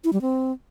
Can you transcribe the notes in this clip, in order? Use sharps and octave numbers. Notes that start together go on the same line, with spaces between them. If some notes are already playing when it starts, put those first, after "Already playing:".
E4
G3
C4